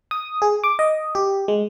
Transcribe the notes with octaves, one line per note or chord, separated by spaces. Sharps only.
D#6
G#4
D6
D#5
G4
G#3